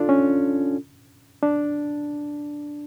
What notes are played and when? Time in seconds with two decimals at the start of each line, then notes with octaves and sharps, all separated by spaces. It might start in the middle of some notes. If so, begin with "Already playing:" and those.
Already playing: D4 F4 A4
0.09 C#4
1.43 D4